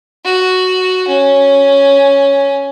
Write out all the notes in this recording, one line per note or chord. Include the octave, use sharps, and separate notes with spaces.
F#4
C#4